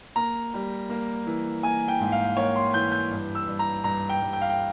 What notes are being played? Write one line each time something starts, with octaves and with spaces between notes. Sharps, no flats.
A#3 A#5
G3
A#3
E3
A#3 G#5
G5
G#2
F5
A#3 C#5
C6
E3 G6
G6
G2
E6
G2
A#5
G2 A#5
G5
G2
G5
F5
G5